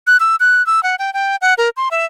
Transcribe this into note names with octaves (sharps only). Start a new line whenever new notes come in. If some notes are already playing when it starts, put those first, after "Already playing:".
F#6
E6
F#6
E6
F#5
G5
G5
F#5
A#4
C6
E5